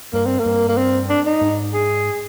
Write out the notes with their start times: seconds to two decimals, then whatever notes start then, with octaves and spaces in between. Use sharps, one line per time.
0.13 G2 A#3
0.26 C4
0.39 A#3
0.45 G2
0.69 A#3
0.77 C4
1.10 D4
1.26 D#4
1.41 G#2
1.74 G#4